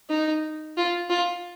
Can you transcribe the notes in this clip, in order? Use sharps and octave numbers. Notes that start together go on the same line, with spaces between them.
D#4
F4
F4